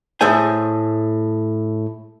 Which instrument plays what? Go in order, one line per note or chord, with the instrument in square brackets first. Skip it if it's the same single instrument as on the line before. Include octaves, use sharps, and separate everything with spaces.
[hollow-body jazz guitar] A2 A3 G#4 C5 G#5